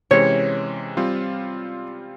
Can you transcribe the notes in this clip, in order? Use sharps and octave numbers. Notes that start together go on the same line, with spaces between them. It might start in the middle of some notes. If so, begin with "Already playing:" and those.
C3 E3 G#3 C#4 C#5
G3 C4 F4